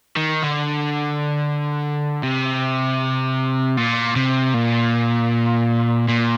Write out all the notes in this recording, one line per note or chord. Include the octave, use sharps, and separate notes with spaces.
D#3
D3
C3
A#2
C3
A#2
A#2